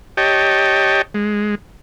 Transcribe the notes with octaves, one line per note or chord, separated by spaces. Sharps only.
G4 C#5 D#5 G5 A5
G#3